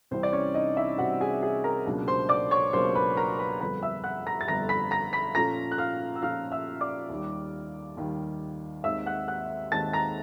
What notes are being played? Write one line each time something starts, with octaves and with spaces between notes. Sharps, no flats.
C2 C3 E3 G3 C4 C5
D5
C#4 C#5
D#4 D#5
E4 E5
C2 C3 E3 G3 C4 F#4 F#5
G#4 G#5
G#4 G#5
A#4 A#5
C#2 B2 F#3 A#3 D4
C5 C6
D5 D6
C#5 C#6
C#2 B2 F#3 A#3 D4 C5 C6
B4 B5
A#4 A#5
B4 B5
G1 F2 D3 G3 B4 B5
E5 E6
F#5 F#6
A#5 A#6
A6
G1 F2 D3 G3 A#5 A#6
B5 B6
A#5 A#6
B5 B6
A#2 F3 A3 C#4 F4 A#5 A#6
F#6
F5 F6
E6
A#2 F3 A3 C#4 F4 F5 F6
E5 E6
D5 D6
D#2 D#3 G3
D#2 D#3 G3
D#2 D#3 G#3 C4 D#4 E5 E6
F#5 F#6
F#5 F#6
D#2 D#3 G#3 C4 D#4 A5 A6
A#5 A#6